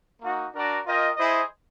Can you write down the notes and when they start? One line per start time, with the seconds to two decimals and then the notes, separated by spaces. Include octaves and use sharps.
0.22 A#3 D#4 F#4
0.53 D4 F#4 A#4 D5
0.85 F4 A#4 D#5 G5
1.17 E4 G#4 C5 D#5